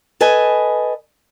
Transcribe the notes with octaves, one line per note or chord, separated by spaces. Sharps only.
A4 B4 D#5 G#5